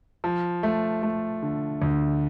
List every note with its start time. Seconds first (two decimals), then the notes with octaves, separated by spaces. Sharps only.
0.24 F3
0.63 A3
1.03 A3
1.42 D3
1.82 D2